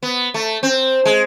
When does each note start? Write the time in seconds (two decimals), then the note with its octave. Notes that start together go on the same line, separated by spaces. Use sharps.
0.03 B3
0.34 A3
0.63 C4
1.05 G#3